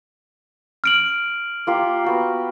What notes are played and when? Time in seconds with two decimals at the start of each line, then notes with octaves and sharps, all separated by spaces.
0.84 F6 D7 F#7
1.67 A#3 F4 G4
2.04 B3 F#4 G4